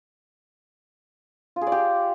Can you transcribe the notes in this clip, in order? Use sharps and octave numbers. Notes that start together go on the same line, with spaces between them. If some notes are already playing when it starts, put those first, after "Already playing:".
F4
G#4
D5
G4